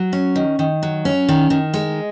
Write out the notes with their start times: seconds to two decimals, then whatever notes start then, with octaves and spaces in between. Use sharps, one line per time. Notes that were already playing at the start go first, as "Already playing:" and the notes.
Already playing: F#3
0.13 C#4
0.36 D#3
0.59 D#3
0.83 F#3
1.05 C#4
1.28 D#3
1.50 D#3
1.74 G#3